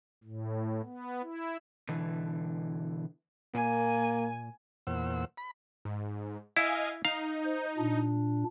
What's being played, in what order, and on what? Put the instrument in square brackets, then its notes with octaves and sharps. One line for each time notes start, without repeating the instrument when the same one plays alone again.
[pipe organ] A2
B3
E4
[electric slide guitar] B2 D3 E3
[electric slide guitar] A#2 [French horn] A#3 [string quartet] G#5
[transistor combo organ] E2 A#2 C5 F#5 E6
B5
[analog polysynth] G#2
[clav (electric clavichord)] E4 [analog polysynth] D#5 F5 G#5
[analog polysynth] D#4 [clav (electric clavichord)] F5
[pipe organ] C5
A#2 D4